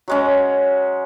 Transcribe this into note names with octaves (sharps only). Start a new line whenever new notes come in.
F#3 G#3 C#4